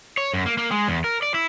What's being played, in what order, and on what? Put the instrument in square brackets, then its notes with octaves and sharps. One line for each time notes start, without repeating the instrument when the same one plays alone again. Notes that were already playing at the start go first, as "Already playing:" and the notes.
[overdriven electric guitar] C#5
F#2
A#3
A#3
G#3
E2
A#4
D5
E4